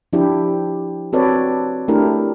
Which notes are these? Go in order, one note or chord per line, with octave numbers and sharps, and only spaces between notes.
F3 D4 E4 G4
C4 F#4 A4 B4 C#5 D5
A3 D4 E4 G4 A#4